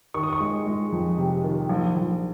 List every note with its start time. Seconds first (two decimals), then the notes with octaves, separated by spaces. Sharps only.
0.14 D#3 C#6
0.23 D#6
0.33 C#6
0.40 G#3
0.66 G#3
0.92 F2
1.18 C3
1.44 D#3
1.69 A#1
1.96 A#1